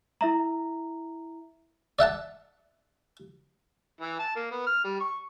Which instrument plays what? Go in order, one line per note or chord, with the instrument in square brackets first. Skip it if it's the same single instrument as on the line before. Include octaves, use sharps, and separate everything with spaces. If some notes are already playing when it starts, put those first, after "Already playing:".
[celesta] E4 E5 A#5
[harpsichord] D5 E5 F#5 A5
[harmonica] E3
A5
A#3
B3
F6
G3
C#6